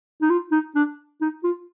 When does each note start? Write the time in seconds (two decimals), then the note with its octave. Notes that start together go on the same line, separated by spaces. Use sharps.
0.22 D#4
0.30 F4
0.52 D#4
0.75 D4
1.21 D#4
1.44 F4